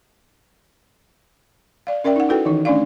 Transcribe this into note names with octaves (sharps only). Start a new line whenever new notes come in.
D5 F5
C#4 A#4 D5 E5 G5
D#4 F#5
E4 F#4 A4 B4 G5
D#3 E3 D#4
A3 C#4 D4 D5 F5